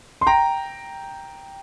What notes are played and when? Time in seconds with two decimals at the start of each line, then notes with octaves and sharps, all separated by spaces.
0.21 C6
0.27 G5 A#5